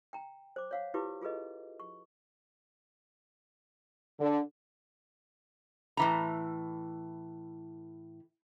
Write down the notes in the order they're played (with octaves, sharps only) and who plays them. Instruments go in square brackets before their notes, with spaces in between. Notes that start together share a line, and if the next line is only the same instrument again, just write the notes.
[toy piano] G5 A#5
C5 D6
C#5 F5 F#5
E4 F4 G4 B4 D6
F4 G#4 A4 B4 D#5
C#6
[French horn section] D3
[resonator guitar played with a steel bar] A2 E3 A#5